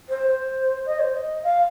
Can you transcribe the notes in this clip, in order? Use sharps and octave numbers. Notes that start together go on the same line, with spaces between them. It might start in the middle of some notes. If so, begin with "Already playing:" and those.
C5
C5
D#5
C5
D#5
F5